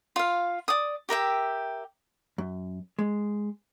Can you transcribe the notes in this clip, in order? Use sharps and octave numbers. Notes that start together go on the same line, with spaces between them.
F4 F5
D5 D#6
G4 A#4 E5 G5
F#2
G#3